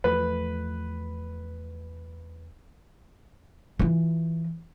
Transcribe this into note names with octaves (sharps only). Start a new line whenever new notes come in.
E2 F3 A3 B4
E3 F4